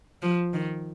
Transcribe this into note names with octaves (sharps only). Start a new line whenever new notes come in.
F3
D#3